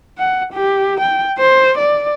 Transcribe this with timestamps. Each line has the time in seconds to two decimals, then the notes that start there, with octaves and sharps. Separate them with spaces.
0.18 F#5
0.53 G4
1.00 G5
1.38 C5
1.78 D5